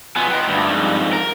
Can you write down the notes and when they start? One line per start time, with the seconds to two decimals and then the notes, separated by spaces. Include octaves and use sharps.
0.16 F#3 B3 F4 G#5
0.31 F4 D#5 G5
0.48 D2 G2
0.67 F2 G#2
1.13 A#4